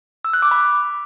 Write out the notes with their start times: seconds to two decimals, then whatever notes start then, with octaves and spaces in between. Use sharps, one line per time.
0.25 E6
0.33 F#6
0.42 D6
0.51 B5